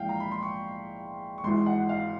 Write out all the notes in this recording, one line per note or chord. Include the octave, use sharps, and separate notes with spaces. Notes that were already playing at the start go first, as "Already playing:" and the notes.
Already playing: A#1 G#2 E3 F5 G5
A#5
B5
C6
C#6
C#6
G#1 G#2 E3 C6
F#5
F5